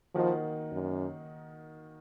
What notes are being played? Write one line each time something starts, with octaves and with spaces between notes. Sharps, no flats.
D#3 F3 A#3 D#4 F#4
F#2